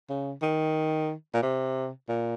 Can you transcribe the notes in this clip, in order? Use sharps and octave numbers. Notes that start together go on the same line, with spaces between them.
C#3
D#3
A#2
C3
A#2